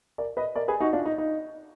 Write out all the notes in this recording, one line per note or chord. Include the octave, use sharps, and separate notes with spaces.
A#4 D5
B4 D#5
A#4 D5
G#4 B4
D#4 F#4
D4 F4
D#4
D#4